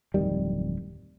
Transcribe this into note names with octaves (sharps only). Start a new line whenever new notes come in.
D1 F2 D#3 G3